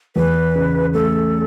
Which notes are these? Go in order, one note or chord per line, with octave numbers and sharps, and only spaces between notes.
E2 B4
C#3
A3 A4